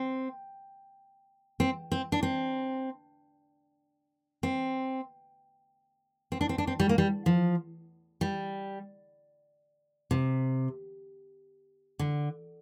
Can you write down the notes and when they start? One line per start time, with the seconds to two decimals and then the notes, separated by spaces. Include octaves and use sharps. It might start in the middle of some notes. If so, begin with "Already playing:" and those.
Already playing: C4
1.60 C4
1.92 C4
2.12 D4
2.23 C4
4.43 C4
6.32 C4
6.41 D4
6.49 C4
6.58 D4
6.67 C4
6.80 G3
6.89 A#3
6.98 G3
7.26 F3
8.21 G3
10.11 C3
11.99 D3